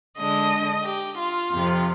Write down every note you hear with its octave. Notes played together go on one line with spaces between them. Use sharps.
D3 G#3 D4 D#5
G4
F4
F2 C3 F3